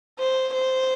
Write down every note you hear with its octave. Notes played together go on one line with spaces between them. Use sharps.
C5
C5